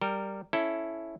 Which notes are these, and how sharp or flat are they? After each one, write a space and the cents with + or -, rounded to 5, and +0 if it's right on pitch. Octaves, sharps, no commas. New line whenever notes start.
G3 +0 A#4 -15 G5 +0
C#4 +0 E4 +0 A4 +0